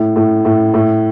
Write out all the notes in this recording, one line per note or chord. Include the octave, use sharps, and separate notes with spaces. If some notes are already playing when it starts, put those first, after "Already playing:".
Already playing: A2
A2
A2
A2